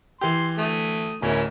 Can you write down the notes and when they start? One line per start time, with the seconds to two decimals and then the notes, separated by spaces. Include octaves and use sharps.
0.21 E3 G4 C6
0.58 A3 D#6
1.22 D1 C#4 E4 A#4